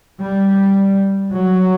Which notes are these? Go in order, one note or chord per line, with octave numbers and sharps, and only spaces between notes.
G3
F#3